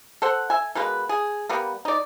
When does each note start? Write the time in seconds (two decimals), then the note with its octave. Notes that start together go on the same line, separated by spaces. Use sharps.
0.22 A4 C5 F#5
0.50 E5 G#5
0.75 B2 G#3 A#3 B4
1.09 G#4
1.49 G3 A#3 B3
1.85 D#4 D5